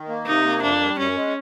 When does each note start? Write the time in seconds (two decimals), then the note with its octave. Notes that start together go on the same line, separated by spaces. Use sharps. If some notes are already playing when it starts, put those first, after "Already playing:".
Already playing: D#3
0.09 A#3
0.26 C3 D#4
0.45 A#3
0.62 F2 D4
0.81 G3
0.98 F#2 C#4
1.16 G#3